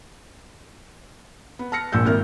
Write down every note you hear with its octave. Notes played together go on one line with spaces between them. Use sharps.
B3
A5 F6 A#6 C#7
A#1 A#2 E6 G6
G#1 E4 A#4 F6